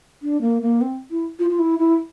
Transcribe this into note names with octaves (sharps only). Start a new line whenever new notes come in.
D4
A#3
A#3
C4
E4
F4
F4
E4
E4